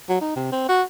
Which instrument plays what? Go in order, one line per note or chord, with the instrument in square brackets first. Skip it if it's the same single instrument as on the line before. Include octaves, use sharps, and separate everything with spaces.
[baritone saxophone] F#3
D#4
C3
C4
F#4